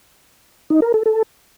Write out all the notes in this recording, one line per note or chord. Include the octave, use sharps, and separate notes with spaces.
D#4
A#4
A4
A4